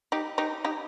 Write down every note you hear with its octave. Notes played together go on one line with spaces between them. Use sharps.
D#4 G4
D#4 G4
D#4 G4